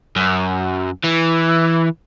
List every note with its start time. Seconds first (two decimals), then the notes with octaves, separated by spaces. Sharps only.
0.16 F#2
1.04 E3